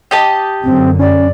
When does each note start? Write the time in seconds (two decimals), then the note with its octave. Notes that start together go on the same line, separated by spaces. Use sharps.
0.11 G4 D#5 A5
0.64 F#2 D3 C4
0.99 C#4 D5